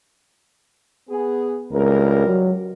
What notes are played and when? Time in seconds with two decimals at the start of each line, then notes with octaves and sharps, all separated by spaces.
1.10 B3 G#4
1.73 C#2 G3 C4 A#4
2.27 F#3